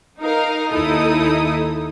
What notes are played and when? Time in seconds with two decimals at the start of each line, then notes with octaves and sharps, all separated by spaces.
0.20 D#4 A#4 F5
0.72 D#2 D#4 E4 A4 D#6